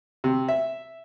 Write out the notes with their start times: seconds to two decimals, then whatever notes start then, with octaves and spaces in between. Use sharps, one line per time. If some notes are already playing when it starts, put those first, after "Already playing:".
0.24 C3
0.49 E5